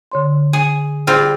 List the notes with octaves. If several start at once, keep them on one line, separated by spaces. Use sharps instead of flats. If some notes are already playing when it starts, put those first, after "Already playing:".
D3 C#5 C6
G#4
G3 C4 F4 G#4 C5